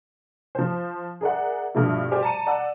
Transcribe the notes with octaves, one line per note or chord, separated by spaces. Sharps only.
F3 C5
G#4 A#4 D5 E5 F#5
G2 B2 F3 G3 A3
F#4 G4 C5 D5 G#5 D6
A5 A#5 C#7 D#7
D5 F#5 E6